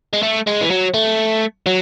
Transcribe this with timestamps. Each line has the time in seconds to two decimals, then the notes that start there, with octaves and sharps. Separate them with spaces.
0.14 G#3
0.23 A3
0.47 G#3
0.61 E3
0.71 F#3
0.94 A3
1.66 F#3